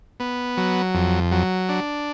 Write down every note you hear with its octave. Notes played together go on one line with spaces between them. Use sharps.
B3
F#3
F2
F#3
D4